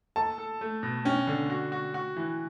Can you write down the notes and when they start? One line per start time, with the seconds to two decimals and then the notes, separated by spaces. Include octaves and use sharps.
0.16 A4 A5
0.38 A4
0.61 A3
0.83 B2
1.05 C#4 G5
1.27 D3
1.50 F#4
1.72 F#4
1.94 F#4
2.16 E3